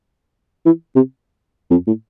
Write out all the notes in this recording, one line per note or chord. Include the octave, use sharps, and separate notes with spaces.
E3
C3
F2
A2